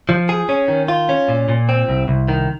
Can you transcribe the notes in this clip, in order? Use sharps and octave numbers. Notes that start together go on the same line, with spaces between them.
F3
G#4
C#4
D#3
F4
C#4
A#2
A#2
C4
C2
C2
D#3